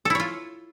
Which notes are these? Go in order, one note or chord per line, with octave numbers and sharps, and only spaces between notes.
E4 F4 A4 C#5